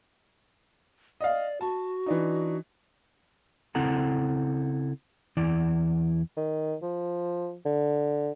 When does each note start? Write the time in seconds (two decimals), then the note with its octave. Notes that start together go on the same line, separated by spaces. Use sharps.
1.21 D5 D#5 F5
1.61 F#4 A5
2.06 E3 D4 D#4
3.75 C#3 C4 E4 A4 F#5 A#5
5.37 E2 E3 E4 D5
6.37 D#3
6.82 F3
7.65 D3